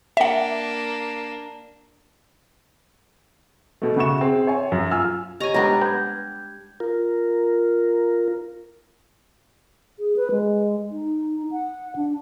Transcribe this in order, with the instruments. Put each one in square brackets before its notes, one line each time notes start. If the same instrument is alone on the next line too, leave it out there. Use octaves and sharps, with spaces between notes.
[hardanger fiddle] A#3 D4 [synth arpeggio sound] E5 F#5
[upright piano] B2 A3
C#3 F#4 E5 C#6 E7
C4 G#4
C#5 G#5
F#2 F#3
F4 G#5 E6 F6
[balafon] G4 C#5 [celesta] D#5 C#6 [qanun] G#5 A#5
[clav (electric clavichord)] B1 B3 [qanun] G3 D4 [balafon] G#3 [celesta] A#5 G#6 A#6
[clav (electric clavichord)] B3 [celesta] G6 G#6
[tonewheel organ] F4 A#4
[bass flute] G#4
B4
G#3
D#4
F#5
D4